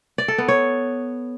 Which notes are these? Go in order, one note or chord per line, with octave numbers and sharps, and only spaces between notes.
D5
A4
B3
C#5